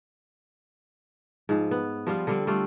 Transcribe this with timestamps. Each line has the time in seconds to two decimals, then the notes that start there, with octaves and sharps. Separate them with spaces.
1.49 G#2 F3
1.71 B3
2.07 F3 G3 F4
2.27 D3 G3 C4
2.47 G3 A3 F4